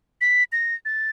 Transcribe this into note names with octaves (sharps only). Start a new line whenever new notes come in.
B6
A#6
A6